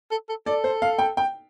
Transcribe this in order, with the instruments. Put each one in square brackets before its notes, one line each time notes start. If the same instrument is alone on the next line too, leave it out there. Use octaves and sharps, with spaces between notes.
[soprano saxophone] A4
A4
[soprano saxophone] A4 [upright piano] D5
[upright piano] C5
F5
G5
G5